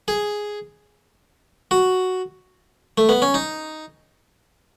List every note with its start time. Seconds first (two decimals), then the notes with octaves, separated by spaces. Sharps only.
0.08 G#4
1.71 F#4
2.98 A3
3.09 B3
3.22 C#4
3.34 D#4